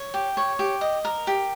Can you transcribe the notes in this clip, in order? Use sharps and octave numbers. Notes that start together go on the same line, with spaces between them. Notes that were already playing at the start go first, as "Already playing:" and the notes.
Already playing: C#5
G4
C#5
G4
D#5
A#4
G4